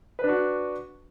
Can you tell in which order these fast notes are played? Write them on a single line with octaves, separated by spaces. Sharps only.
B4 D4 F#4